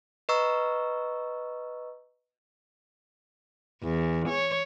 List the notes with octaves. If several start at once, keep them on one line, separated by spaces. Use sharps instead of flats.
B4 D#5 A#5 C#6 E6
E2
C#5